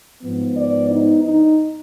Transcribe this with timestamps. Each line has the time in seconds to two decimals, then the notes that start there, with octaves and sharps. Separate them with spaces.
0.22 G#2 F3 B3
0.56 D5
0.90 D#4
1.23 D#4